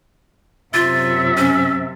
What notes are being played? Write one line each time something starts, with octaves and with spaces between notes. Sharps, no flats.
F#2 C3 F4 E5 A6
C#4